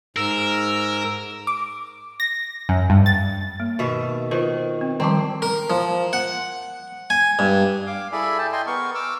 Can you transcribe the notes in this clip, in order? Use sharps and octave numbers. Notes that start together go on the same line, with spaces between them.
G#2 A#4 E6
D6
A#6
F#2
G2
A6
A#3
B2 D#3 E5
D#3 F4 B4 C5
C4
D#3 F3 G3 C4 D4 C5
A#4
F3
F#5
G#5
G2
F5 D6
E4 G#4 A4 D5 G#5 B5
G5 A5
D#5 G5 G#5 C6
B3 A#4 C#6
D6 E6 F6